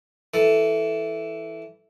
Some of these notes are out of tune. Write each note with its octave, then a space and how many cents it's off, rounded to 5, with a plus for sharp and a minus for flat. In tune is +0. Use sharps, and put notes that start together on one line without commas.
E3 +0 A4 +0